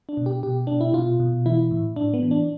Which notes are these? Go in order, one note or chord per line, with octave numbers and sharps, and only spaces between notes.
D4
B2
G4
B2 G4
B2 D4
E4
B2 F4
B2
E3 E4
A2
A2 D4
B3
E3
D4